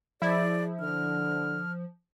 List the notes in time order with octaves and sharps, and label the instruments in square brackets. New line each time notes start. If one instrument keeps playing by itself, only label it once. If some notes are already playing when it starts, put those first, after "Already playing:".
[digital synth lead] F3 [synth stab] E4 [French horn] G#4 [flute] D5
[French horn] D3 [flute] F6